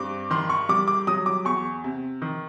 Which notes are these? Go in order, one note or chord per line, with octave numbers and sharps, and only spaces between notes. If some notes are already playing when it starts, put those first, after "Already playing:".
Already playing: G2 C4 D6
D#3 C6
C#6
G3 D6
D6
F#3 D#6
D6
E2 C#6
C3
D#3